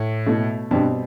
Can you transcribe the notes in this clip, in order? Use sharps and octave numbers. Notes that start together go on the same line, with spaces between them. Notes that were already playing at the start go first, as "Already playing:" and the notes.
Already playing: A2
B2 A3 E4
G2 B2 G3 C4